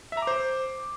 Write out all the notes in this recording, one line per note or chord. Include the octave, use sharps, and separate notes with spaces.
E5
A#5
D6
C5